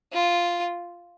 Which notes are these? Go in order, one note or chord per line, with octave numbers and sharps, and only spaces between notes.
F4